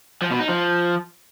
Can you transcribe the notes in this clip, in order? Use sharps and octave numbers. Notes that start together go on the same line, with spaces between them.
F3
B2
D#4
F3